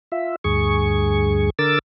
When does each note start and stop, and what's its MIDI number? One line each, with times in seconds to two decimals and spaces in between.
0.12 0.36 65
0.12 0.36 76
0.44 1.50 38
0.44 1.50 43
0.44 1.50 68
0.44 1.50 85
1.59 1.79 50
1.59 1.79 70
1.59 1.79 86
1.59 1.79 88
1.59 1.79 93